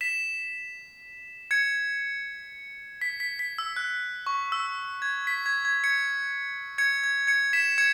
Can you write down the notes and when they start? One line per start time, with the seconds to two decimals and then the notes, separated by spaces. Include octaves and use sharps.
0.01 B6 E7
1.51 G#6 C#7
3.01 B6
3.20 B6
3.39 B6
3.58 E6
3.76 F#6
4.27 C#6
4.52 E6
5.02 G#6
5.27 B6
5.46 G#6
5.65 G#6
5.84 G#6 C#7
6.78 G#6 C#7
7.04 G#6
7.27 G#6 C#7
7.53 B6 E7
7.78 G#6 C#7